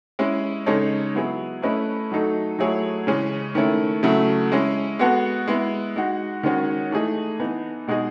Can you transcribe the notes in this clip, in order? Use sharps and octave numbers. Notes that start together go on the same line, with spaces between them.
G#3 C#4 E4
C#3 G#3 D#4 A4 C#5
F#3 B3 E4 G#4
A3 C#4 E4 B4 D#5
F#3 A3 D#4 A4
F#3 A3 E4 G#4 C#5
C#3 E3 G#3 C#4 G#4
D#3 A3 C#4 E4
C#3 F#3 A3 E4
G#3 C#4 E4
G#3 B3 F#4 A4
G#3 B3 E4
G#3 D#4 F#4
D#3 G#3 C#4 F#4 C#5
E3 A3 D#4 G#4 D#5
E3 B3 D#4
B2 G#3 D#4 G#4 D#5